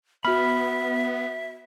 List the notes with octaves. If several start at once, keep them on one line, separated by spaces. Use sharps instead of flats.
B3 F#4 E5 B5 F6